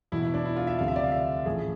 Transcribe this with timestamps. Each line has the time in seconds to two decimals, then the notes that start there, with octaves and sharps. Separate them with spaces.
0.12 E2 B2 E4
0.23 E4
0.34 D4
0.45 E4
0.56 F4
0.67 E5
0.79 D2 C3 F3 F5
0.88 E5
0.96 D5
1.04 F5
1.12 E5
1.45 A1 A2 F3 G#4